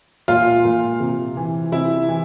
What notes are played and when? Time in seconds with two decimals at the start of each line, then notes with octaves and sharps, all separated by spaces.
0.28 A#2 F4 F5
0.65 A#2
1.00 C3
1.37 E3
1.72 C3 E4 E5
2.09 E3